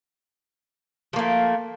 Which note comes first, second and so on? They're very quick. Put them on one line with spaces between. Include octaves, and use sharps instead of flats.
F3 A#3 A3